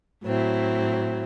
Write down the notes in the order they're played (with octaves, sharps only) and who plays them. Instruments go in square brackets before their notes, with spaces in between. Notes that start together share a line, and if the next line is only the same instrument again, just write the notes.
[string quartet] A2 F#3 C4 E4